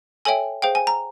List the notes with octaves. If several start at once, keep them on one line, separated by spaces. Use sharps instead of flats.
A4 C#5 E5 G5 G#5
G#4 C5 F5 G5
G#5
A#5